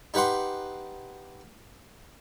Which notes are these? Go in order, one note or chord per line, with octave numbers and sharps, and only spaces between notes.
D#4 G4 B4 F#5 C6